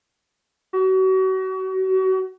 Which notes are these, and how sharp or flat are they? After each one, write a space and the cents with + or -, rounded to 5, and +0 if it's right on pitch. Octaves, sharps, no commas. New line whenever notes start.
F#4 +35